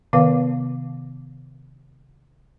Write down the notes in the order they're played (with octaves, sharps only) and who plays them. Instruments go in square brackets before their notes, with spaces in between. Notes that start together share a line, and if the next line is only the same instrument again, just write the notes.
[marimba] C3 D#3 B3 B4 F5